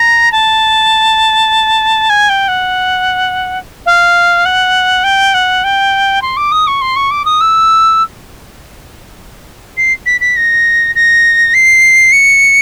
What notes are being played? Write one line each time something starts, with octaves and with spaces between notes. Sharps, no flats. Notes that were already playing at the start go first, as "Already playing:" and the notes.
Already playing: A#5
A5
G#5
G5
F#5
F5
F#5
G5
F#5
G5
C6
D6
D#6
C#6
C6
C#6
D6
D#6
E6
C7
B6
B6
A#6
A#6
C7
C#7